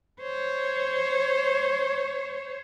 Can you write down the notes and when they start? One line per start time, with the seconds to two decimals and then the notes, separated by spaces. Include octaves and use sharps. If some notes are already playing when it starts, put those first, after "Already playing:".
0.21 C5 C#5